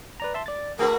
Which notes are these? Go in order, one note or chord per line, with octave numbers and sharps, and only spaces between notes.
B4 D5 A#5
E5 A5 C6
D5 A6
A3 F#4 G#4 A#4 B4